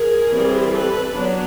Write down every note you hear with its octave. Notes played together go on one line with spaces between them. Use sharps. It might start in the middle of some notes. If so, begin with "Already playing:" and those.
Already playing: G#4 A#4
E3 G3 C4
A4 B4
F#3 B3 D4